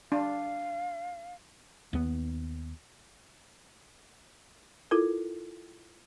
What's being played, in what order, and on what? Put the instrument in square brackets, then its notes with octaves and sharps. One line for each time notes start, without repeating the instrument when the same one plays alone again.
[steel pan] D4 [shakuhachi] F5
[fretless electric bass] D#2 B3
[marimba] E4 F4 A4 A#4